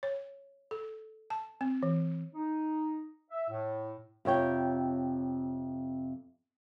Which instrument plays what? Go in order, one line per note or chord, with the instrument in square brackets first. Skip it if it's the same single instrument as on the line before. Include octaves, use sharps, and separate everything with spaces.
[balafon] C#5
A4
A5
C4
E3
[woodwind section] D#4
E5
A2
[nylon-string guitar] F2 C3 C#5 G5